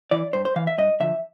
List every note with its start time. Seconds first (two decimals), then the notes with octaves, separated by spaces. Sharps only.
0.11 E3 D5
0.33 G2 C5
0.45 C5
0.56 E3 F5
0.67 E5
0.78 G2 D#5
1.00 D3 F3 E5